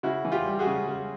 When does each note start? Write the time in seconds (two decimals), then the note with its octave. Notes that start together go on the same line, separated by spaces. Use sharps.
0.03 C#3 E4 F#4
0.25 E3
0.32 F4 G4
0.46 G3
0.59 F#4 G#4
0.66 C#3
0.88 C#3